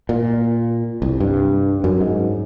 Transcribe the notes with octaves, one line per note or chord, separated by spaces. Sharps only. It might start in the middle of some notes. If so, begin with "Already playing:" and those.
A#2
C2
G2
F#2
G#2